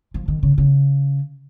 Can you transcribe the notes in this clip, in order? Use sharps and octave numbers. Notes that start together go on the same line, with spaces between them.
F3
D#3
C#3
C#3